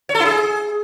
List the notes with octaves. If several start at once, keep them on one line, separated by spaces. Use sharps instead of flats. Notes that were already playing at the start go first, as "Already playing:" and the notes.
C#5
A4
E4
G#4